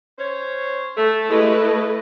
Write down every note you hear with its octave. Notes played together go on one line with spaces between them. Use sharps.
C#4 C5 C#5
A3
G#3 A3 E4 G4 B4 D#5
D#5